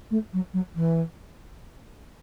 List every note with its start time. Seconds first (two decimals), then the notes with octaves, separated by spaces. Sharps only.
0.11 A3
0.33 F#3
0.53 F#3
0.75 E3